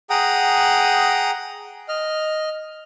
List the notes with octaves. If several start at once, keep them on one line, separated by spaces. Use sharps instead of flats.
G#4 F#5 G5 A#5 D#6
D#5 F6